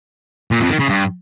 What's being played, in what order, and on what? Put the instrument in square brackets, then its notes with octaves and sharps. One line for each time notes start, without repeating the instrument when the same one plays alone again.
[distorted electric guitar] A#2
F2
D#3
C#3
G2